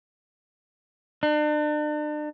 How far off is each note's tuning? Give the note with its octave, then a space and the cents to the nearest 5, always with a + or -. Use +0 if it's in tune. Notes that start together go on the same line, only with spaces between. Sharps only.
D4 +40